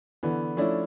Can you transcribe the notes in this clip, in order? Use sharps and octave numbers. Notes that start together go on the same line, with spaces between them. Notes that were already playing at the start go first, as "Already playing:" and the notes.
D3 E3 B3
F3 A3 C#4 D4 E4